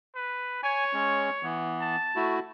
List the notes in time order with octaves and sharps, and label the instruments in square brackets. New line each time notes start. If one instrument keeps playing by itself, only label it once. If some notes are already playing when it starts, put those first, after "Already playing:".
[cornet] B4
[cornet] C#5 [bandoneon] G#5
[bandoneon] G#3 C#4
E3 B3
[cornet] A5
[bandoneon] A3 E4 F#4